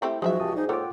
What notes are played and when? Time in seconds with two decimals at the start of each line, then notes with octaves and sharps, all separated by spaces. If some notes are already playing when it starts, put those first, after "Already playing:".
0.02 A3 C4 E4 G4
0.22 G#2 F3 F#3 G#3 F4 F#4 G#4 E5
0.40 C#2 G4 A5 D#6
0.56 G#2 D#4 G#4 D5
0.69 A#3 F4 A4 C#5 F#5 G5 D6